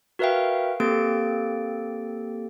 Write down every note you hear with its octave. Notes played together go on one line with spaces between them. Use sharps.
F#4 A#4 B4 E5 F5 G5
A#3 C4 G4 A4 A6 D7